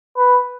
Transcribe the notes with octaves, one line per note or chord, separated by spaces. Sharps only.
B4